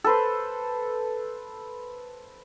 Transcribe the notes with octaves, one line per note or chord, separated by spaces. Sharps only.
A4 B4 C5